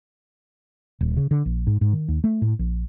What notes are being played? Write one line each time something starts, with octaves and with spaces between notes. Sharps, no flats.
D#1
C#3
D3
A#1
G#2
G#2
D#3
D#2
A3
A2
A#1